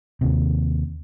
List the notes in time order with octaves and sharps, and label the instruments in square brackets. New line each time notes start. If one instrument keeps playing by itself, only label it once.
[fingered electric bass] D#2 C3